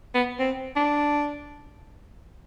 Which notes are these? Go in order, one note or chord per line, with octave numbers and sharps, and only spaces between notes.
B3
C4
D4